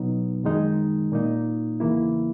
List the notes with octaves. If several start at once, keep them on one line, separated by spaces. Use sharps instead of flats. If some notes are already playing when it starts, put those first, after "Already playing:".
Already playing: B2 F#3 B3 D#4
F#2 D#3 G#3 D#4
A#2 A#3 D#4
E2 C#3 E3 A#3 E4